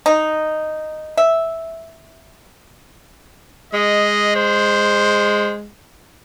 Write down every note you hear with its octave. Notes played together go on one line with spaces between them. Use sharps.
D#4
E5
G#3 D#5
C5